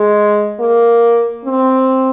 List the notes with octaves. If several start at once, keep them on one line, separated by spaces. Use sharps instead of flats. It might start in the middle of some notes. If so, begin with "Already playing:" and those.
Already playing: G#3
A#3
C4